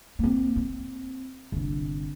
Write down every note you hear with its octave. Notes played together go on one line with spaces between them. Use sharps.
A#3 C4
C4
G1 C3